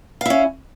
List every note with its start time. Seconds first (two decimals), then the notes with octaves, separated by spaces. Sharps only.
0.21 F5
0.26 E4
0.30 C#4